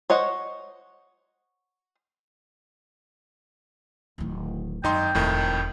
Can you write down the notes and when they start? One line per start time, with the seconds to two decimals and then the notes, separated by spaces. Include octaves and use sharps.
0.10 C5 C#5 D#5 F#5
4.18 D1 D#3
4.84 G#1 F#2 D#4 G5 C6
5.15 E1 F2 A2 D#3